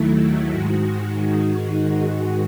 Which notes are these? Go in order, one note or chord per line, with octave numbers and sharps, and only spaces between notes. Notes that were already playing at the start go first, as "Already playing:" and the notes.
Already playing: D#2 D#3 F#3 A3 E4
G#2 D#3 G#3 F#4